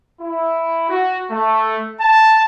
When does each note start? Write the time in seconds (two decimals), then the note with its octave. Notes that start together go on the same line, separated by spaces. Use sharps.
0.20 E4
0.89 F#4
1.31 A3
2.01 A5